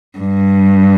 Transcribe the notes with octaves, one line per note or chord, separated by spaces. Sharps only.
G2